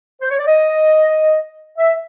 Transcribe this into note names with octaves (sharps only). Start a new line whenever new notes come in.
C5
C#5
D5
D#5
E5